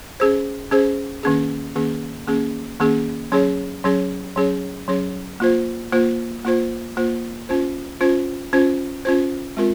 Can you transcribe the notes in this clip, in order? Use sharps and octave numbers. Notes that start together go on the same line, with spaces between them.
C#4 G#4 C5
C#4 G#4 C5
D#3 A#3 C#4 G#4
D#3 A#3 C#4 G#4
D#3 A#3 C#4 G#4
D#3 A#3 C#4 G#4
F#3 C#4 G#4 C#5
F#3 C#4 G#4 C#5
F#3 C#4 G#4 C#5
F#3 C#4 G#4 C#5
A#3 F4 C5
A#3 F4 C5
A#3 F4 C5
A#3 F4 C5
C#4 F4 C5
C#4 F4 C5
C#4 F4 C5
C#4 F4 C5
G#3 C4 F4 A#4